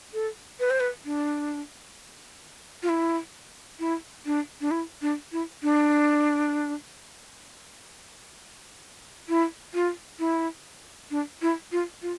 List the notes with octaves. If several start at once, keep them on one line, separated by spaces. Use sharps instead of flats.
A4
B4
C5
B4
D4
F4
E4
E4
D4
D4
E4
D4
E4
D4
E4
F4
E4
D4
E4
F4
F4